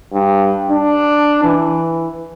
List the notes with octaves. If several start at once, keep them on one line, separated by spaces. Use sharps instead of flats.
G2
D4
E3